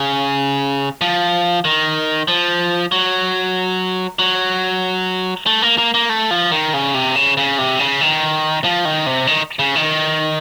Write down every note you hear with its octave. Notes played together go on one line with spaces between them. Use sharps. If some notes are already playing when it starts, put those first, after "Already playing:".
Already playing: C#3
F3
D#3
F3
F#3
F#3
A3
A#3
A#3
A#3
A3
F3
D#3
C#3
C3
C#3
C#3
C3
C#3
D#3
F3
D#3
C3
D#3
C#3
D#3